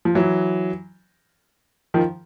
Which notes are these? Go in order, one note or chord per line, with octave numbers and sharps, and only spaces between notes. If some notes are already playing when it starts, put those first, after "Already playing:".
F3
E3 F#3
D#3 F3